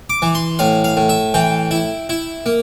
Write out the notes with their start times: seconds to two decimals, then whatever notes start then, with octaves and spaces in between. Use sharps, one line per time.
0.10 D6
0.22 E3
0.35 C6
0.59 A2 F5
0.84 F5
0.97 A2
1.09 E5
1.34 E3 G5
1.71 E4
2.09 E4
2.46 A#3